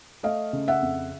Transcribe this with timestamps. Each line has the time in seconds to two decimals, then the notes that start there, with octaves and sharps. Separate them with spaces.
0.23 A3 D#5 F5
0.53 C#3
0.68 E5 F#5
0.82 F2